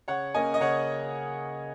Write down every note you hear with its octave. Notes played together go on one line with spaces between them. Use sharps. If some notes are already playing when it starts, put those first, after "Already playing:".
C#3 C#5 F#5
A#3 C#4 D#5 G#5
D#5
C#3 C#5 F#5